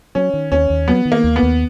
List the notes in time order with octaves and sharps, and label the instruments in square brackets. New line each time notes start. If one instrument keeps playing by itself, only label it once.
[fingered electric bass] F#3 [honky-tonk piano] C#4
[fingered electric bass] D#3
[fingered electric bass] D#2 [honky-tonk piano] C#4
[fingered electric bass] D#2
[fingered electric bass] F#3 [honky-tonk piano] B3
[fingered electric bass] D#3
[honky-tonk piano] A#3
[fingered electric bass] D#2
[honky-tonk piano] B3
[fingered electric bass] D#2